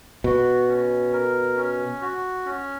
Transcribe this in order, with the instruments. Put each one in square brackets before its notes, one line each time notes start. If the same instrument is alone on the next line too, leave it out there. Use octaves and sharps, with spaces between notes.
[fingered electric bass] B2 [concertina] F#4
[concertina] C#4
A#4
C#4
F#4
C#4